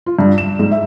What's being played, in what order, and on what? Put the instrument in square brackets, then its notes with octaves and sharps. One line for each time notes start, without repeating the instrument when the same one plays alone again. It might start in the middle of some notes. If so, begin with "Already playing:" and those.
[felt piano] F4
G2
E7
G#2
E5